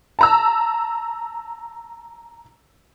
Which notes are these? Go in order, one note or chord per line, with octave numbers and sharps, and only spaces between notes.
A5 A#5 E6